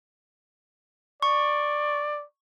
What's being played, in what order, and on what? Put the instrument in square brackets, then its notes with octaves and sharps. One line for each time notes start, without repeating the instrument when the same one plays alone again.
[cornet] D5 [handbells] C#6